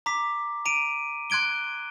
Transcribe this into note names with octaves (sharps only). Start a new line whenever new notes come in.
A#5 D6 B6
A#5 D7 D#7
C6 F#6 G#6 D7 G7